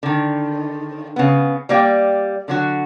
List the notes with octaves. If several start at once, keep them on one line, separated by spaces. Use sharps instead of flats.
D3 D#3
C#3 B3
G3 A#3 D5 G5
D3 F#3 F#4